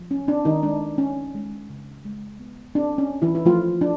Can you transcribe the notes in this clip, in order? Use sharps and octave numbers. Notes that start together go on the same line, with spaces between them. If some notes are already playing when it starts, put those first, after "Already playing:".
Already playing: F3
C#4
C4 D4
D#3 D#4
G#3 D4
C4 C#4
G#3
C#3
G#3
B3
C4 D4
C#4
C4
E3 E4
E4
F3 A3 F4
F3 D4